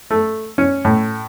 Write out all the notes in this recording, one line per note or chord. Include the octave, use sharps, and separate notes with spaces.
A3
C#4
A2